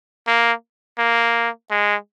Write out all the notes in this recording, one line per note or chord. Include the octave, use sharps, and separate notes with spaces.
A#3
A#3
G#3